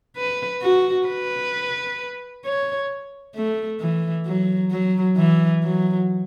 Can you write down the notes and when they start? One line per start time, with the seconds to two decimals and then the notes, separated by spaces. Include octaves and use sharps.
0.16 B4
0.62 F#4
1.07 B4
2.45 C#5
3.35 A3
3.80 E3
4.26 F#3
4.71 F#3
5.17 E3
5.63 F#3